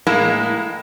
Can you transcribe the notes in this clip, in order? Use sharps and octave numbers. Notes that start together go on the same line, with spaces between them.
A2 G#3 A#3 E4